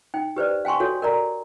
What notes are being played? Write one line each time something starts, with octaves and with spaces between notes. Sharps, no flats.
D#4 G5
G4 B4 C5 D5
F5 G5 G#5 C6 C#6
F#4 A4 C#5
A#4 D5 A#5